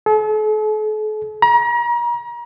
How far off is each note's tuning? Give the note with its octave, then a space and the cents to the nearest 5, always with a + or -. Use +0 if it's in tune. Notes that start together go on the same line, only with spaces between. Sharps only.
A4 -45
A#5 +35